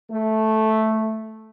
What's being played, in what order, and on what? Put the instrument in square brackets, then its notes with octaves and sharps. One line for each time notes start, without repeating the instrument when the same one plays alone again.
[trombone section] A3